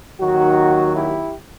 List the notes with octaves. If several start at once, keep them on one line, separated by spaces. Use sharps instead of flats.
D#2 D#3 F#3 D#4 F#4
E4 G4